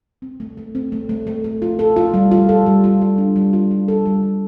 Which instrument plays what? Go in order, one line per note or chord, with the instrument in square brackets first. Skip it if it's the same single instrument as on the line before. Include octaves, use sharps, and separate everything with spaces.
[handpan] C4
A3
A3
C4
A3
A3
A3
A3
F4
A4
F4
G3
F4
A4
G3
F4
F4
D4
G3
F4
F4
A4
G3
G3